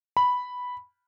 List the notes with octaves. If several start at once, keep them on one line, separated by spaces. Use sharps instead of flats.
B5